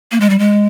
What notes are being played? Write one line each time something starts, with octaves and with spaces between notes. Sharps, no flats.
A#3
G#3
G3
G#3